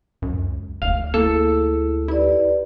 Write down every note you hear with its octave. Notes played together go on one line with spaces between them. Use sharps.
C#2 F#2
F1 D2 F5
A#3 E4 G#4 A4
E4 G4 B4 D5